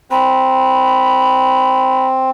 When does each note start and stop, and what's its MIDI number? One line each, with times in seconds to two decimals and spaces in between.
0.11 2.30 60
0.11 2.07 83